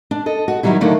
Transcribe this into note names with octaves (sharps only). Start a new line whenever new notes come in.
D4
A4 D#5
F#4
D#3 E3 F#3 G3 E4
D3 D#3 F#3 A3 A#3 D4